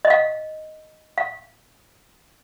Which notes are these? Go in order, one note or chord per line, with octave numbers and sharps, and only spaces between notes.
D#5
F5
F5